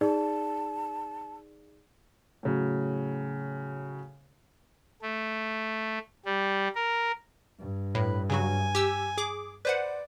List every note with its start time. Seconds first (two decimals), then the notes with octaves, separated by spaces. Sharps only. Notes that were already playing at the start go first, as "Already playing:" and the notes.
0.01 D#4 G#4 D5 A5
2.43 A2 C#3 F#3
5.02 A3
6.25 G3
6.75 A#4
7.59 G2
7.95 A2 B4
8.30 C#3 F#3 F#4 G#5
8.75 G4 E6
9.18 G#4 D6
9.65 B4 C5 D5 F#5